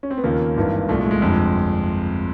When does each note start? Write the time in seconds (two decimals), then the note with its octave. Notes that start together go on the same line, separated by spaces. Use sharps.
0.03 C#4
0.11 C4
0.17 B3
0.24 D#2 C#3 F3 A#3
0.57 G#1 G2 E3
0.89 C2 A#2 F3 A3
1.00 G#3
1.11 G#3
1.21 G1 F2 C3